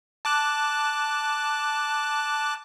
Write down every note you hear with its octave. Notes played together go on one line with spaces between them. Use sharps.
A5 D6 F#6